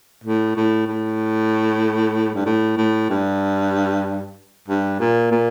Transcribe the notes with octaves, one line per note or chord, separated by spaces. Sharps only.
A2
A2
A2
G2
A2
A2
G2
G2
A#2
A#2